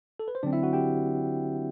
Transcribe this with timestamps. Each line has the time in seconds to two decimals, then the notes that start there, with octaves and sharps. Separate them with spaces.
0.20 A4
0.28 B4
0.35 C5
0.43 D3 F#3 C4 D4 D5
0.53 E4 E5
0.63 F#4 F#5
0.73 G4 G5